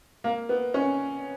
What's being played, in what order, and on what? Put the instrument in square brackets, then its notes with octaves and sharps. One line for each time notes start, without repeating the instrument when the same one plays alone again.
[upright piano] A#3
B3
C#4